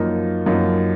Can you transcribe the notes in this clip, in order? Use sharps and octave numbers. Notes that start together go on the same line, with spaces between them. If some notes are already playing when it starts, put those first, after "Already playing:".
Already playing: F#2 F3 A#3 D#4
F#2 F3 A#3 D#4